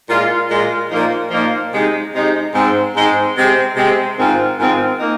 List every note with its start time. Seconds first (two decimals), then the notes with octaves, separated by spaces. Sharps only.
0.08 A#2 G#3 F4
0.48 A#2 G#3 F4
0.90 A#2 F3 A#3 D#4
1.31 A#2 F3 A#3 D#4
1.72 C3 G#3 D#4
2.13 C3 G#3 D#4
2.53 G#2 G#3 C4
2.94 G#2 G#3 C4
3.35 C3 G#3 C4
3.76 C3 G#3 C4
4.17 G#2 D#3 C4 F4
4.57 G#2 D#3 C4 F4
4.99 A#3 D#4